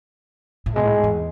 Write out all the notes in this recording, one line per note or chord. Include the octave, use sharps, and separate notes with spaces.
A2
B2 G#3
A2
G#2
E2